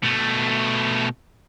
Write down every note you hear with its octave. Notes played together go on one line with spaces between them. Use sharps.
B2 A3